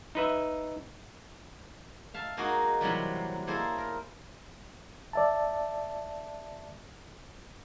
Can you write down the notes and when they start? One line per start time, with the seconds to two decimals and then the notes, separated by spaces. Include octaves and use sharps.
0.15 D#4 B4 E5
2.14 E5 F5 A5
2.37 G#3 A#3 D#4 F#4 G#4
2.81 C3 E3 F#3 G3
3.47 A#3 E4 G#4 A4 C5
3.78 A#4
5.13 D5 E5 A5